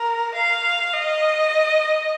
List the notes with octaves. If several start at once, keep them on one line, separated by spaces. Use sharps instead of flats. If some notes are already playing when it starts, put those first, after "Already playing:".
Already playing: A#4
F5
D#5